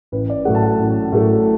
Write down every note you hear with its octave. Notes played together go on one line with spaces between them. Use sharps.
A1 B4
D5
A2 F#3 A3 F#5
A5
F#5
A1
A2 F#3 A3